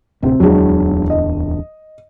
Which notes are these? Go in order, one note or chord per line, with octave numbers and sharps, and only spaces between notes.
D1 C3 C4
D1 E2 F#3 G#3 D4
D#5